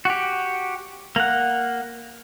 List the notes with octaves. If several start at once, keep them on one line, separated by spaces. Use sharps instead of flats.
F#4 G4
A#3 F#5